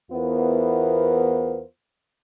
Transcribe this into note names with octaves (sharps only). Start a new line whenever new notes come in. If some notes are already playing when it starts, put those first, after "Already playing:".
E2 B3 E4 F4 A#4 C5